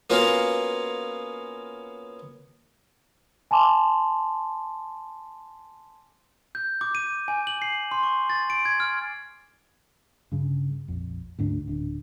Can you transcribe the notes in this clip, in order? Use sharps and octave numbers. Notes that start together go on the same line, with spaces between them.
A#3 B3 C#4 F4 F#4 F5
G#5 A5 C6 D6
G6
D6
D#7
G#5
F#7
C7
C6
C#6
A6
D7
G#6
F6
G2 C#3
A#1 F2
D2 G#2 D4
D1 D3 D4